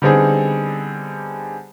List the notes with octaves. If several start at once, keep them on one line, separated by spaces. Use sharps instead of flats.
D3 G3 B3 C4 D#4 G#4